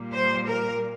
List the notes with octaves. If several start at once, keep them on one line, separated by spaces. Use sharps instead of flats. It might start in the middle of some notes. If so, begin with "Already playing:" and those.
Already playing: A#2 G3 A#3
C5
A#4